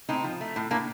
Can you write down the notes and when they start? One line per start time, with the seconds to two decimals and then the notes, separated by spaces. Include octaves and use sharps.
0.09 A2 C4 D#4
0.24 F3
0.41 A3
0.56 A2
0.71 A2 A#3 D4